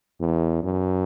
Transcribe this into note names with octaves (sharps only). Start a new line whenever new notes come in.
E2
F#2